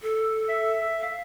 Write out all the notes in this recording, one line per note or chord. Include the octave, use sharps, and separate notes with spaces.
A4
E5
F5